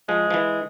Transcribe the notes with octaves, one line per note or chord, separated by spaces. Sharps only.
F3 G#3
F3
E3